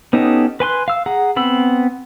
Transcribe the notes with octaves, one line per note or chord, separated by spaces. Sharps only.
B3 C#4 D#4 G4 A4
B4 G#5 C6 F#6
F5 E6
G#4 F#5 A#5
B3 C4 B5 E6